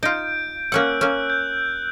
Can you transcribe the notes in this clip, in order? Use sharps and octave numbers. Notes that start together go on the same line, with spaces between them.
D#4 F4 G6 D7
A#3 C#4 F#5 E6 F#6
A#3 C#4
G6